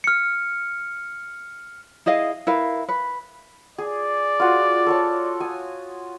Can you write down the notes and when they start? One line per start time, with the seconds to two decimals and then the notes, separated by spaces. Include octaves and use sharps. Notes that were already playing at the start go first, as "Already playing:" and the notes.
0.04 F6 C#7
2.06 E4 G#4 D#5 F5
2.47 E4 A#4 B4 F5
2.89 B4
3.78 G#4 D5
4.40 F4 F#4 F#5
4.86 A4 C#5 A5
5.40 G#5 D#6